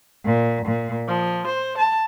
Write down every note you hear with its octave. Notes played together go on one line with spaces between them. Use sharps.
A#2
A#2
F3
C5
A5